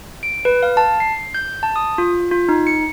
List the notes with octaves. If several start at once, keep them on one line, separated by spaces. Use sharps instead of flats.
D7
B4
F5
A5
C7
G6
A5
D#6
F4
F4
D#4
C#7